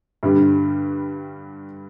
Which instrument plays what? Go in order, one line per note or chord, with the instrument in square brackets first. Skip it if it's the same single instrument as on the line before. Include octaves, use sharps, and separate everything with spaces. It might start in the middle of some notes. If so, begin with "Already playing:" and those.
[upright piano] G2 D3 G3